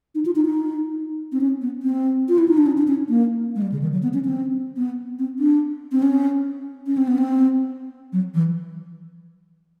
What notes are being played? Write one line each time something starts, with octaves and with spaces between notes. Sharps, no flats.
D#4
F4
D#4
D#4
C4
C#4
B3
C4
F4
E4
D#4
D4
C#4
D4
C#4
A#3
G#3
G3
C#3
D#3
F#3
B3
C#4
C4
B3
C4
D4
C4
C#4
C#4
C4
B3
C4
F#3
E3